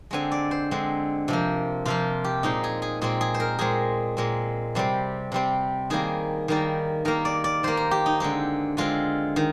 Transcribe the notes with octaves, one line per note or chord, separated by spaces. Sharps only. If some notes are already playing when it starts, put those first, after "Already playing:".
D3 G#3 C4 G#5
D5
C5
D3 G#3 C4
C3 F3 A#3
C3 F3 A#3 F4
G4
A#2 G#3 C4 D#4
G#4
G#4
A#2 G#3 C4 G#4
G#4
C5
A#4
A#2 G#3 C4 G#4
A#2 G#3 C4
C3 G3 C4
C3 G3 C4
D#3 G3 A#3 G#4
D#3 G3 A#3
D#3 A#3 A#4
D5
D5
D#3 A#3 C5
A#4
G4
D#4
D3 G#3 C4 G4
D3 G#3 C4 F4
D#3